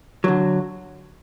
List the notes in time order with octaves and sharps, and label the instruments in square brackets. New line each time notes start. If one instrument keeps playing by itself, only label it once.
[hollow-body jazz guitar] D3 F#3